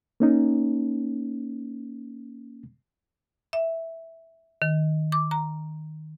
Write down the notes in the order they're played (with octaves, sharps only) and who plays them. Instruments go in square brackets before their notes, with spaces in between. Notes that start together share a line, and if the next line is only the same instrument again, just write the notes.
[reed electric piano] A#3 C#4 D#4
[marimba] E5
D#3
D6
A#5